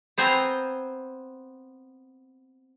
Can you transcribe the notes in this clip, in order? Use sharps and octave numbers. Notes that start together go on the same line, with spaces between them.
B3 C4 C5 G#5 A#5